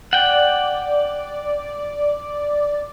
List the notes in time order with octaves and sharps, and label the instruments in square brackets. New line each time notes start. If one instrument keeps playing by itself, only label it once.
[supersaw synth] D5 [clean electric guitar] F#5 G5